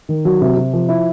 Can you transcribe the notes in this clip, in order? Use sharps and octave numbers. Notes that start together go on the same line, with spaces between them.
D#3
F#3
C3
C3
F3
E4